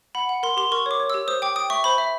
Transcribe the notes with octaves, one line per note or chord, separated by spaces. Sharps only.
F#5 B5
F#5
A#4 C6
G4 C6
A#4 C#6
C#5 D6
C#5
G4 E6
C5 D#6
G5 D6
G5 D#6
E5 C#6
C5 B5
E5